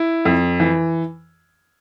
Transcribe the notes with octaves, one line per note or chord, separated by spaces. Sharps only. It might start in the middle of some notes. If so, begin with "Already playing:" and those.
Already playing: E4
F2
E3